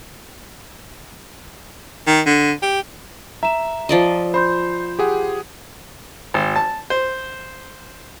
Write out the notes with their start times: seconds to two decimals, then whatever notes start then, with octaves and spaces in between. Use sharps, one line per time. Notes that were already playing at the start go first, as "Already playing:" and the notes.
2.07 D#3
2.26 D3
2.62 G4
3.43 E5 A#5 E7
3.89 F3 D5 D#5
4.34 C5 B5 C6 G6
4.99 G4 G#4 F#5
6.34 G#1
6.56 A5
6.90 C5